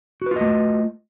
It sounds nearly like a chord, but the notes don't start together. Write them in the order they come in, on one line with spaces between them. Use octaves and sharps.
F#4 B4 F4 D#5 A3